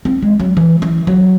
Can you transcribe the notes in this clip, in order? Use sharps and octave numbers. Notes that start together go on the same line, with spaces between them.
C4
G#3
F#3
E3
E3
F#3